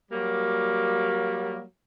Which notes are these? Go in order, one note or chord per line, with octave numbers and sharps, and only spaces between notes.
F#3 G3 A#3